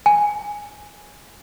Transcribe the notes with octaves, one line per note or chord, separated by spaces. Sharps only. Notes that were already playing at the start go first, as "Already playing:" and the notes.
G#5